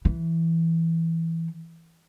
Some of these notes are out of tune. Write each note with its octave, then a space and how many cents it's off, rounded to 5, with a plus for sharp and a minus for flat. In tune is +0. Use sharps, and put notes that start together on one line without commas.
E3 +0